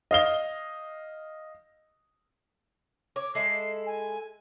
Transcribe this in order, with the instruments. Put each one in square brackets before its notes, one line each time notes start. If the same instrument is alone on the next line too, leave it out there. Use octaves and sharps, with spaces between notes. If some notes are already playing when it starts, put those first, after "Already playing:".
[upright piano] D#5 F5 G7
[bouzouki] C#5 [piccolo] D6
[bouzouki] G#3 E4 A4 [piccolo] C7
[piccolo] G#5